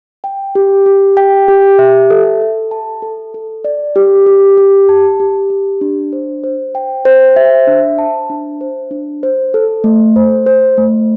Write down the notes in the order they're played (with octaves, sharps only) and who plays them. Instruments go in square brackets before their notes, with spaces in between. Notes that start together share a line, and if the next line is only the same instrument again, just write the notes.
[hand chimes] G5
G4
G4
G5
G4
E5
A4
A4
A5
A4
A4
D5
G4
G4
G4
A5
G4
G4
D4
C5
C5
G5
C5
E5
D4
A5
D4
C5
D4
C5
A4
A3
C5
C5
A3